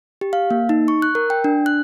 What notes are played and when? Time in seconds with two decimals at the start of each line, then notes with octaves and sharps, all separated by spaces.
0.21 G4
0.33 F5
0.51 A#3
0.69 D#4
0.88 C#6
1.02 F#6
1.15 A#4
1.30 G5
1.44 D4
1.66 F#6